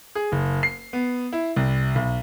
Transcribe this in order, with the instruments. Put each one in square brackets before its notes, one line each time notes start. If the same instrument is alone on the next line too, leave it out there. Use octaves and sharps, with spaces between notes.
[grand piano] G#4
F#1
C7
B3
E4
C2
B1